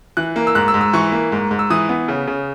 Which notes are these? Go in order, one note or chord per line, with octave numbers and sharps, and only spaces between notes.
E3 F#6
A#3
E6
G#2 F#6
E6
G#2
E6
E3 C#6
A#3
G#2
G#2
E6
E3 D#6
B3
C#3
C#3